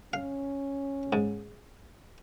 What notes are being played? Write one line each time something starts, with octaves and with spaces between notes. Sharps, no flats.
C#4 F5
G#2